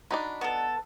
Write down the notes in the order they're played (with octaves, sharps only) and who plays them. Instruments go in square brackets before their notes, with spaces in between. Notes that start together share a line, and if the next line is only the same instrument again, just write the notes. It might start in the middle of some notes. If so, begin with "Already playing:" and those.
[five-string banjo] D4 D#4 F#4 [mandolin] B5
[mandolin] B3 A4